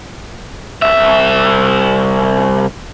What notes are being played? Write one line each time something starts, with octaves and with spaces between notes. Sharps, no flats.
C2 E5